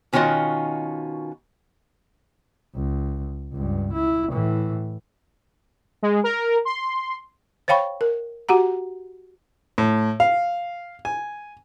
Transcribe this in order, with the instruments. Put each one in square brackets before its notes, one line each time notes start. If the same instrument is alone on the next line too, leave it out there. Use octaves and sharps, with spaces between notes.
[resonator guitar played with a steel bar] B2 D#3 C#4 F4 F#4 D#5
[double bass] C#2
C#2 G2
E4
A2 E3
[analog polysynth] G#3
A#4
C6
[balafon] C5 C#5 F5 G5 B5 C#6
A#4
F#4 G4 F#5 A#5
[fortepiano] A2
F5
G#5